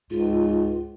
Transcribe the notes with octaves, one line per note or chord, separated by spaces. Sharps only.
C#2 G#2 F4